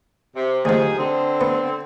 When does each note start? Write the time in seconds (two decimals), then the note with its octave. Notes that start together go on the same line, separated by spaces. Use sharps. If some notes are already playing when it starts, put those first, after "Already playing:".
0.35 C3
0.65 D2 C3 D#3 F3 G#4
0.99 D3 C4
1.41 B3